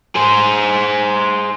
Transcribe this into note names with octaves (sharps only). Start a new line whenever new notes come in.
G#4 C5